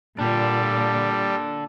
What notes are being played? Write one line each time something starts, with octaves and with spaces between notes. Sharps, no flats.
A#2 G3 D4 A4